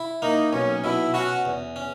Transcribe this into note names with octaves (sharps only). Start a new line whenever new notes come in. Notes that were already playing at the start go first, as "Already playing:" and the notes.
Already playing: E4
A#3 D#4
B1 C#4
B2 E4
C#4 F#4
E2
C#4